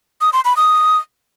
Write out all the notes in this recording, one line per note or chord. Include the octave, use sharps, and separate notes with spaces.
D#6
C6
B5
D#6